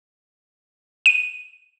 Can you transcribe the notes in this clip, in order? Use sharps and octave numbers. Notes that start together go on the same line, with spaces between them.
D#7